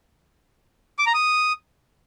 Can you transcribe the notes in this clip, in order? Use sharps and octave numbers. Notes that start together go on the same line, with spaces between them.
D6
A#5
D#6